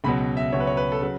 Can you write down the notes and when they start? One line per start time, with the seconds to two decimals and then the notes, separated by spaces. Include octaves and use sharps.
0.04 C#2 B2 F#3 B5
0.37 E5
0.53 C#2 B2 F#3 C#5
0.60 B4
0.67 C#5
0.77 B4
0.92 A4
1.02 C#3 F#3 B4